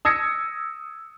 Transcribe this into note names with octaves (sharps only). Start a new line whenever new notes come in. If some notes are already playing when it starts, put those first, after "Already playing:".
D#6 E6 G#6 A#6 C#7